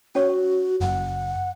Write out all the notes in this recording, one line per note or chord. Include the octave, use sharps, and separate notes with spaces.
C#4 F#4 C#5 C#6
F#1 F#2 F#5